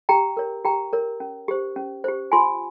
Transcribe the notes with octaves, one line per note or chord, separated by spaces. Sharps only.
G4 G5 A#5
A#4 C#5
G4 G5 A#5
A#4 C#5
C#4
G4 C5
C#4
G4 C5
F4 G#5 C6